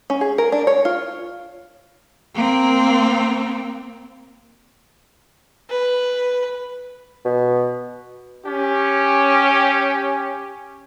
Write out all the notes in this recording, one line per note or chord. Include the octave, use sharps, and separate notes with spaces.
C#4
G#4
A#4
D4
C#5
F4
A#3 C4
B4
B2
C#4 G4